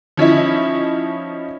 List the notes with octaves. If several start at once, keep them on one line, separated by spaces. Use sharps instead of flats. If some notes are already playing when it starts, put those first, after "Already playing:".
F3 C#4 D#4 E4